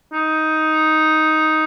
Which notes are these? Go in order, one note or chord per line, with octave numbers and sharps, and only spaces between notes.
D#4